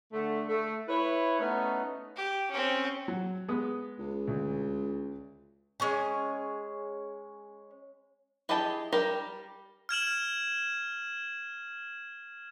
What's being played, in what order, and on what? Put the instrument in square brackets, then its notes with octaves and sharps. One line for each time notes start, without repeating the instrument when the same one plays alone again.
[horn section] D3 A3
A3
E4 B4 C#5
A3 B3 C#4 D#4
[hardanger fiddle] G4
C4 C#4
[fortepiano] F#3
G#3 B3 D#6
[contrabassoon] C#2
[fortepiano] D2
[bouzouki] G#3 C#4 C#5 G#5
[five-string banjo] E4 G4 G#4 D#5 A5
G3 G4 A#4
[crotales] F6 G#6 E7 F#7